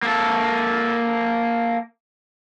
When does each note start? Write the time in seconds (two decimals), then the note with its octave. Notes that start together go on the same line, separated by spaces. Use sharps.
0.03 A#3 A4